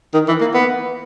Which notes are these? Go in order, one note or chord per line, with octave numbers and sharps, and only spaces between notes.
D#3
E3
A#3
B3